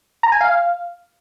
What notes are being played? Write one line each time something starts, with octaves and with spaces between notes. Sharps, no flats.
A#5
G#5
F5